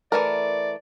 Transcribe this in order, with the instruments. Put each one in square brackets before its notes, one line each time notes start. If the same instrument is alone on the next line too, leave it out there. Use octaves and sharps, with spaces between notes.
[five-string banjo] E3 A3 A#4 [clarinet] D5